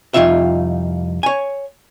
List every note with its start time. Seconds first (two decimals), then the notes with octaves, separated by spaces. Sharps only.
0.14 C2 F2 C#3 D#4 F4 E5
1.23 C#5 G#5